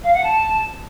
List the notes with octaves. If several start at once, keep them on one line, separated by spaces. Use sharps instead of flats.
F5
F#5
A5